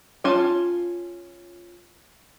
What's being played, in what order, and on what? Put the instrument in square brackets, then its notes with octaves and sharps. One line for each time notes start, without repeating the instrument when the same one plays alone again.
[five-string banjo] C#4 F4 A5